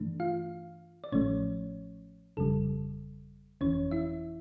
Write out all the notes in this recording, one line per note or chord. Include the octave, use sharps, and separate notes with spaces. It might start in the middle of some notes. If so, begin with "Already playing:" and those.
Already playing: G2 E3 A3 D4
F4 F5
D5
A1 A2 F3 A3 C#4 C#5
G1 F2 C#3 G3 A4
G1 F2 E3 C#4 C#5
E4 E5